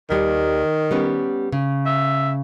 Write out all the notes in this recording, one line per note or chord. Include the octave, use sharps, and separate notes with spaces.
D#2 D#3 G3
G3 B3 C#4
C#3
E5